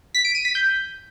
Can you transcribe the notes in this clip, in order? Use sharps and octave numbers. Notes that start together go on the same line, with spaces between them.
B6
D7
D#7
B6
G6